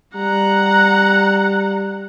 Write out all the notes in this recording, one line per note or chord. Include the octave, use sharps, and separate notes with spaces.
G3 F#5 A#5